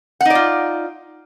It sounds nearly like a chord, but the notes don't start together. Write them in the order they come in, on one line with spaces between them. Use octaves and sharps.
F#5 D#4 D5 F4